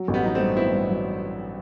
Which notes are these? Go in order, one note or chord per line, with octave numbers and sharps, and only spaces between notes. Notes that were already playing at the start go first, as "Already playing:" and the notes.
Already playing: F#3
A1
G3 B3
F#3 D#4
G2 A3 C4
B3 C4 E4
G2
F#3